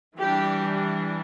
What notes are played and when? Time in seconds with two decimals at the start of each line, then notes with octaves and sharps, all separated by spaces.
0.18 E3 G3 D4 G4